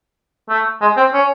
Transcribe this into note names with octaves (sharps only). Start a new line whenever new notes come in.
A3
G#3
C4
C#4